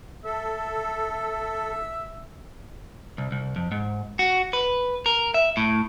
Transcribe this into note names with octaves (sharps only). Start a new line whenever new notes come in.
A4 E5
C2
C2
F2
G#2
F#4
B4
A#4
E5
A2